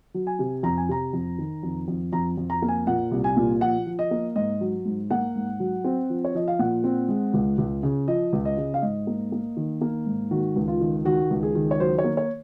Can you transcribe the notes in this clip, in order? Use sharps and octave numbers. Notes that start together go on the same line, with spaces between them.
F#3
G#5
C3
F2 A#5
G#5
C3 A#5
F2
D#3
F2
F2
F2 A#5
F2
A#5
A#3
G#5
A#2 F#5
C2
G#5
A#2
F3 F#5
F3
D#5
A#3
G#2 D#5
F#3
G#2
A#3 F#5
G#2
F#3
C4
F3
C#5
F3 D#5
F5
A#2 F#5
C4
G#3
C#2
C#2
C#3
F3 D#5
C#2
D#5
C#3
F5
G#2 D#5
A#3
A#3
D#3
A#3
G#2
D#3 F#4
C#2
F4
D#3
D#3 F#4
C#2
G#4
D#3
C#5
F#3 C5
C#5
A#3
C#5